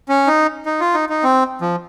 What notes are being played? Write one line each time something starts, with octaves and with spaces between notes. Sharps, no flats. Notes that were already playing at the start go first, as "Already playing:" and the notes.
C#4
D#4
D#4
F4
D#4
D#4
C4
F3